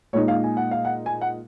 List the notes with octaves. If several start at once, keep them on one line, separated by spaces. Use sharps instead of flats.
A#2 G#3 D#4 C#5
F5
G#5
F#5
F5
F#5
G#5
F#5